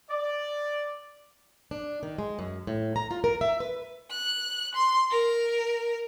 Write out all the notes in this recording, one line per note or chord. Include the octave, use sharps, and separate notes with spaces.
D5
D4
D#3
G#3
F#2
A2
A#5
F4
A#4
E5
B4
F#6
C6
A#4